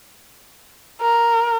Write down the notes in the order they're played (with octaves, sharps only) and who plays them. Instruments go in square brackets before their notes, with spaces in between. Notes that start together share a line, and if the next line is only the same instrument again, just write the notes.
[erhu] A#4